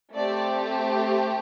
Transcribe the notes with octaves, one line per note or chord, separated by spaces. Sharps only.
A3 C4 G4 D5